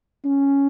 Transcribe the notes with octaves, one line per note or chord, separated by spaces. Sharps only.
C#4